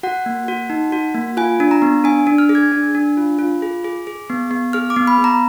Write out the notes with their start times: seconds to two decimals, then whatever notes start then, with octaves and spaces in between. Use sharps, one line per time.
0.03 F#4 F#5
0.26 A#3
0.48 F#4
0.70 D#4
0.92 F#4
1.15 A#3
1.37 F4 G#5
1.60 D4
1.71 A#5
1.82 B3
2.04 D4 G#5
2.27 D4
2.38 F6
2.49 G#4
2.55 G#6
2.72 D4
2.95 D4
3.17 F4
3.39 F4
3.62 G#4
3.84 G#4
4.07 G#4
4.29 B3
4.51 B3
4.73 G#4 F6
4.90 D6
4.96 B3
5.07 B5
5.18 B3
5.24 A#5